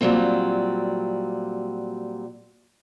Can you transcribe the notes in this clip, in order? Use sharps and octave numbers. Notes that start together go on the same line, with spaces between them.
A#2 D#3 F#3 G3 C4